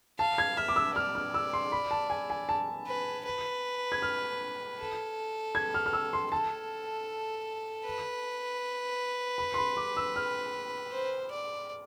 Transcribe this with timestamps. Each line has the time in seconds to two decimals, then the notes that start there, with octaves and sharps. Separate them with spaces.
0.19 F5 A5
0.38 G#6
0.57 E5 F6
0.68 D6
0.76 E6
0.95 D5 F6
1.15 F6
1.34 E6
1.53 C6
1.72 B5
1.91 A5
2.10 G#5
2.30 G#5
2.49 A5
2.86 B4
3.25 B4
3.92 G#6
4.02 F6
4.79 A4
5.55 G#6
5.74 F6
5.86 F6
5.93 E6
6.13 C6
6.32 A4 A5
7.85 B4
9.38 B5
9.54 C6
9.58 B5
9.77 D6
9.97 E6
10.16 F6
10.91 C5
11.31 D5